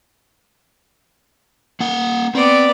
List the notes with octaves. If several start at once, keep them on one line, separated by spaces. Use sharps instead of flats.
A#3 F#5
B3 C4 D5